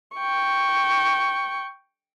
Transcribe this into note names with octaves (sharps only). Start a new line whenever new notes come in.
G5 C#6